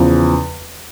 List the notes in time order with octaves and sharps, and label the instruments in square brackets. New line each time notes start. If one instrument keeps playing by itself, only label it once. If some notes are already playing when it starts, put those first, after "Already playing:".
Already playing: [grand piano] E2 C#3 F3